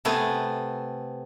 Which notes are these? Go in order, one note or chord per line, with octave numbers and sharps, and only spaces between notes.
C3 A3 B3 G#5